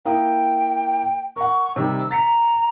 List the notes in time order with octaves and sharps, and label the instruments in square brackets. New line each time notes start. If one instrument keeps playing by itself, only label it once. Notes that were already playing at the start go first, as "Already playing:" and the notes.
[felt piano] A#3 E4 D#6 [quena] G5
[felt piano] A#4 F#5 [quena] C#6
[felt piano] C3 D#3 G3 [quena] E6
[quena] A#5 [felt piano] A6 B6 C#7